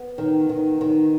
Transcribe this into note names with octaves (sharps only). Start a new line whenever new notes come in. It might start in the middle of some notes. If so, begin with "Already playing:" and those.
Already playing: B3
D#3
D#3
D#3